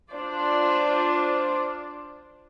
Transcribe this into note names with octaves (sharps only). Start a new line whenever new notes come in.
D4 F4 C5 D5